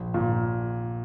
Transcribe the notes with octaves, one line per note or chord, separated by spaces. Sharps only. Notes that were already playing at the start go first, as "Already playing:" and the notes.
Already playing: A#1
A#2